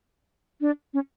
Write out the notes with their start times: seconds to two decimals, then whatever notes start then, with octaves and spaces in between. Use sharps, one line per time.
0.61 D4
0.94 C#4